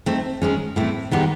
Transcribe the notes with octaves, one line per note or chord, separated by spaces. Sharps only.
A3 C4 D#4
D#3 G#3 C#4
A2 E3 A3 C4 E4
D#3 G#3 B3 D#4 G4